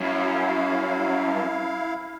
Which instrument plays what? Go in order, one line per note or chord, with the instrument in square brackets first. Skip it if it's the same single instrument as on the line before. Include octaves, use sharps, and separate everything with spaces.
[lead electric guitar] F#2 [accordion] E4 F5